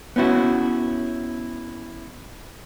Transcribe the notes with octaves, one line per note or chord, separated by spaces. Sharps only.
B3 C#4 E4 F#4